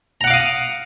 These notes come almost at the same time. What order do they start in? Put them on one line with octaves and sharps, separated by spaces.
A#5 F#5 D6 F5 D#6